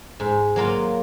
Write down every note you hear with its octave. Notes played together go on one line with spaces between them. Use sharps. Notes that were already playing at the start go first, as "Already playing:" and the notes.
G#2
F#3 A#3 F4